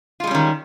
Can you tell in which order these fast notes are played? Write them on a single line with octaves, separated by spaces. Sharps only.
F4 G#3 G3 C#4 D#3